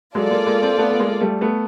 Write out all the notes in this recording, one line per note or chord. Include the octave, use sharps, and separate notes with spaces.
F#3 G#3 F4 A4 D5
G#3 A#3
G#3 A#3
A#3 C4
A3 B3
B3
G#3 A#3
G3 A3
A3 B3